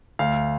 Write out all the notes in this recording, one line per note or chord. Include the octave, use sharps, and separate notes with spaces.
D2 F5